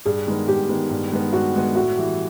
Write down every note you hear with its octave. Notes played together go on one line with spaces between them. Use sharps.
G2 G#4
D#3 G#3 B3
G2 G4
D#3 G#3 B3
G2
D#3 G#3 B3
G2 F#4
D#3 G#3 B3
A2 F#4
E3 G3